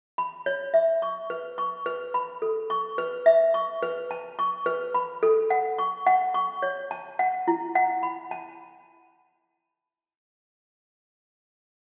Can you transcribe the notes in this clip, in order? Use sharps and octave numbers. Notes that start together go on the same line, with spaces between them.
B5
C#5
E5
C#6
B4
C#6
B4
B5
A4
C#6
B4
E5
C#6
B4
A5
C#6
B4
B5
A4
F#5
C#6
F#5
C#6
C#5
A5
F#5
E4
F#5
B5
A5